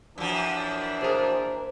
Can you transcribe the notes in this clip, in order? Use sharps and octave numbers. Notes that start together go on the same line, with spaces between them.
F#2 E3 F3 D4
A#2 G#4 A#4 C5